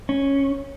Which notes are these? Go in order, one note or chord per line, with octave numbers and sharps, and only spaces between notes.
C#4